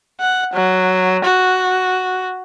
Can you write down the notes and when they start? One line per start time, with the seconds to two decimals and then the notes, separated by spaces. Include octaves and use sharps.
0.20 F#5
0.54 F#3
1.25 F#4